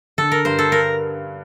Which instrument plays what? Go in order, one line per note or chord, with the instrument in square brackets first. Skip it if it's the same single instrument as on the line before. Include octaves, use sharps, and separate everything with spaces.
[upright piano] D3 [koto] A4
[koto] A#4
[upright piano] G2 [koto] C5
[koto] A4
A#4